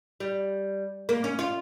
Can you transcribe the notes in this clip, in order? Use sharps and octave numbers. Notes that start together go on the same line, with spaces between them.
G3
A#3
C#4
F4